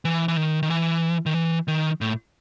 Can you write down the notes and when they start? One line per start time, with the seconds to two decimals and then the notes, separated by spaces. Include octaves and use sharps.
0.05 E3
0.28 E3
0.37 D#3
0.63 D#3
0.70 E3
1.26 D#3
1.34 E3
1.68 D#3
2.01 A2